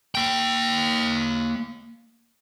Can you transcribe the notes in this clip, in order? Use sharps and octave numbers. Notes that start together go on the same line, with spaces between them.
A#3 G5